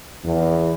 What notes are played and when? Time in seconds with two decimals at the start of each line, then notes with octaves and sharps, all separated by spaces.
0.22 E2